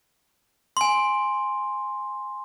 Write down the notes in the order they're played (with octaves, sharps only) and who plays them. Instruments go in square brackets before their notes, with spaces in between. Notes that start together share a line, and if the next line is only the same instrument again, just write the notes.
[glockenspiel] G#5 C6